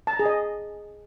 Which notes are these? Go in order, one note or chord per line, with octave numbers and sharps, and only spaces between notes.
A5
A#5
G#4
D#5